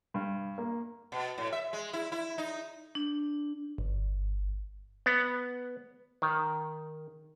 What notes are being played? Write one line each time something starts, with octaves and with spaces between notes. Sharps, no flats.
G2
A#3
B2
A2
E5
G#3
E4
E4
D#4
D4
G1
B3
D#3